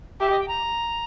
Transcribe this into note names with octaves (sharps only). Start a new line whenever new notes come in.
G4 E5
D#5
G5
A#5